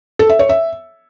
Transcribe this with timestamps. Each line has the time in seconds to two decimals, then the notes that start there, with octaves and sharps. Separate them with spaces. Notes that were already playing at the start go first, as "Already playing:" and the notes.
0.19 A4
0.29 E5
0.39 C#5
0.49 E5